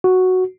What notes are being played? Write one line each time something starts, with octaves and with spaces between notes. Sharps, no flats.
F#4